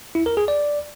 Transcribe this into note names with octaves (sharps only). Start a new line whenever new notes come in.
E4
A#4
G#4
D5